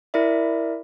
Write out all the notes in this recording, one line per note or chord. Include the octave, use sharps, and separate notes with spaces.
E4 A#4 D5 E5